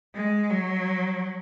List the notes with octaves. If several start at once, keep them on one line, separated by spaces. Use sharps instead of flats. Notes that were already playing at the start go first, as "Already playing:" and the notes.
G#3
F#3